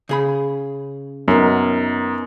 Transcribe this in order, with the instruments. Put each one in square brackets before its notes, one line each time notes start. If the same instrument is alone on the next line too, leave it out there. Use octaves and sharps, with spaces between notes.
[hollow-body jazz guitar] C#3 G#4 B5
[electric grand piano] F#2 [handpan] B3 D#4 A#4